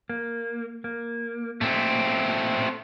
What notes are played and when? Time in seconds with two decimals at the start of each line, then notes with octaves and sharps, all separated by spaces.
0.10 A#3
0.84 A#3
1.61 A#2 A3 C4